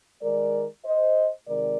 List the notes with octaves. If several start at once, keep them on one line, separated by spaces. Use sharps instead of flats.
D#3 G#3 A#4 D5
C5 D#5
C3 D#3 G#3 A#4 D5